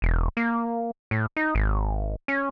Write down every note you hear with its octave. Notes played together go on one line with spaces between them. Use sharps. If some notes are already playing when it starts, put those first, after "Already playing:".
E1
A#3
A2
D#4
G#1
C#4